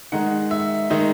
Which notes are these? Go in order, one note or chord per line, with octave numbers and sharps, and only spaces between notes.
D#3 G#3 D#4 F#5
E5
D#3 G#3 D#4